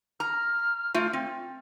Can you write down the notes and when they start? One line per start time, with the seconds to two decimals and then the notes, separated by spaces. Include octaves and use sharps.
0.20 A#5 F6
0.94 A3 F4
1.13 C4